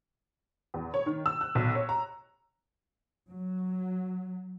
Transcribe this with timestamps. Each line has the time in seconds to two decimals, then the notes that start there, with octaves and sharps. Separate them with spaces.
0.74 E2
0.94 C#5
1.06 D#3
1.26 E6
1.41 F#6
1.55 B1
1.75 C#5
1.89 A#5
3.30 F#3